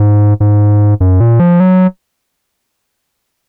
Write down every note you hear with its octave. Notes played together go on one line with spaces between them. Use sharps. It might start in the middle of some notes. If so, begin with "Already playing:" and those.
Already playing: G#2
G#2
F#2
A#2
F3
F#3